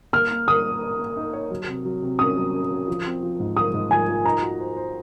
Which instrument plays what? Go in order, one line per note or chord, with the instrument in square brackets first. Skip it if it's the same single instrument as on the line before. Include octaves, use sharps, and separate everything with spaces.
[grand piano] A#3 [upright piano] F6
[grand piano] A#3
[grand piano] A#4 [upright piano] D#6
[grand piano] A#4
A#4
A#3
D#4
C#5
F#3
C3
F#3
C3
[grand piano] C#4 [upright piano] D#6
[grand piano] F#3
C#4
F#3
F3
C4
F3
G#2
[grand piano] F3 [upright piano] D#6
[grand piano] G#2
[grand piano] F3 [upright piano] G#5
[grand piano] F3
[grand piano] D#4 [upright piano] A#5
[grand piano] F#4
C5
C5